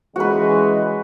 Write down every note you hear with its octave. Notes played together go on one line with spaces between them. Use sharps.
C#3 E3 G#3 F#4 B4